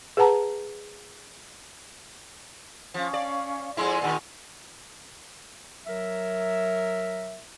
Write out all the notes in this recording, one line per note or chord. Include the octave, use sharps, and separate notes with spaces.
G#4 B4 F#5 A5 A#5
F3 C#4 F5
D5
F2 G#3 E4 D5 G#5 C6
A#2 D#3
F#3 A#4 E5